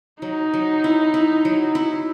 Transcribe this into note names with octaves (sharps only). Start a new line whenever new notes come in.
F#3 D#4
F#3
E4
E4
F#3
E4